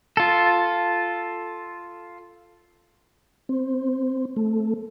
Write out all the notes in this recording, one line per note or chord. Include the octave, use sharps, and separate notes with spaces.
F4 A4
C4
A3